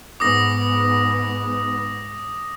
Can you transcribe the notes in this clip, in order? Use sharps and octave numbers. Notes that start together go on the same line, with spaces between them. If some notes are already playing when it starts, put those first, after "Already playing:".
G#2 B3 D6 D#6 A#6